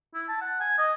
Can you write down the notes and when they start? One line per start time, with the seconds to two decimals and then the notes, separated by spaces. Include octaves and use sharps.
0.14 E4
0.28 A5
0.41 F#5
0.60 G#5
0.78 D#5